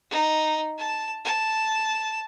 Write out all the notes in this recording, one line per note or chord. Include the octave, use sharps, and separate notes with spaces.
D#4
A5
A5